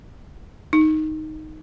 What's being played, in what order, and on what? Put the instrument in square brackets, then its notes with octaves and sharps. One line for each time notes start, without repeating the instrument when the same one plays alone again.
[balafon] D#4